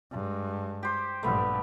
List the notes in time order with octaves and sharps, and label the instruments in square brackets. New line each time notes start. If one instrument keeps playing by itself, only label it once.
[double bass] G2 G#3
[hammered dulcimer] G4 C5
[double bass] A#1 G2 [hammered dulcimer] A3 B3